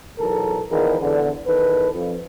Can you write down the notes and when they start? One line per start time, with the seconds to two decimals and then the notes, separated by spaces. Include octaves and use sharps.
0.19 B1 E2 A4 A#4
0.70 E2 D#3 F3 G#4 A#4 B4
1.00 E2 D3
1.46 E2 D#3 A4 B4
1.94 F2